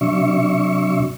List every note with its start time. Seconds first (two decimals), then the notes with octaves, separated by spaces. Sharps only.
0.01 C3 F#3 D4 E5 C#6